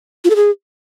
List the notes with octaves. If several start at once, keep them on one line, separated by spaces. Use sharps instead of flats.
F4
A4
G#4